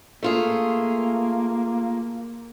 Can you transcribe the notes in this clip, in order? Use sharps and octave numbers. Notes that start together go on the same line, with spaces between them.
A3 A#3 F4 G#4